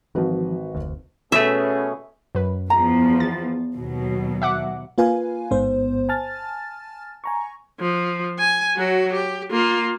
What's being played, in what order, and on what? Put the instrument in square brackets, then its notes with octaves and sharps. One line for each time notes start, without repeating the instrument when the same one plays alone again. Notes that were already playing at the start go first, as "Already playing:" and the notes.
[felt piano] G#1 F#4 B4 [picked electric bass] E3 F3
[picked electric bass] F1 D2
[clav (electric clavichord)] B2 A3 [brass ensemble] B3 C#4 G#4 [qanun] E5
[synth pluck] F#2 B4
[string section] E2 F3 [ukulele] A#5
[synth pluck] A6
[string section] D#2 B2 F#3
[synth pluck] E5 F#5 D6
[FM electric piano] A#3 F4 B4 F5 G#5
A1 G#2 B3 C5
G#5 A5 F6 A6
G#5 A#5 C#6
[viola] F3
G#5
F#3 F#4
G4
A#3 F4